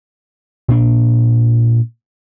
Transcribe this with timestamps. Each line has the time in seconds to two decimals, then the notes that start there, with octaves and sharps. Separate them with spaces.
0.68 A#2 D4